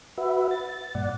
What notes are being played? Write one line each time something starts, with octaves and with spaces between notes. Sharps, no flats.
F#4 B4 E5
A6
G2 A#2 D5 F#5